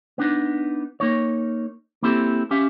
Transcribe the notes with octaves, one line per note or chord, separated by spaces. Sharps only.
B3 D4 D#4
A#3 D#4 C#5
A#3 C4 E4 G4 A4
C#4 G4 E5 F5